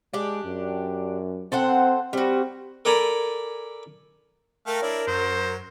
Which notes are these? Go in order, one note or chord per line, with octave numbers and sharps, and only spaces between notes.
G#3 D4 G4
F#2
C4 A4 C5 F#5
G3 C4 F#4
A4 A#4 D5 G#5 A#5 B5
A3 A4 A#4 F5 G5
D4 E4 C#5
F#2 F#3 C5